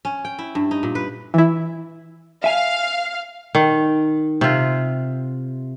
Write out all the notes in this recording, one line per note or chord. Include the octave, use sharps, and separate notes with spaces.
C#4
G5
E4
G2
D#4
A#2
B4
E3 E4
E5 F5 G#5
D#3
C3 F4